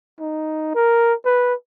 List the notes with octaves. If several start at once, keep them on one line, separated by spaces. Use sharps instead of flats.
D#4
A#4
B4